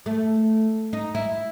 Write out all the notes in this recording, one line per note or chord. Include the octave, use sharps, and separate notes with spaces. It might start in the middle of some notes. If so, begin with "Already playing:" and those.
A3
D#4
E4